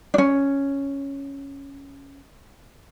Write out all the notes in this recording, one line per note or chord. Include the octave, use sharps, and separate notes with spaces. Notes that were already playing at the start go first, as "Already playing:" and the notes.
C#4 D4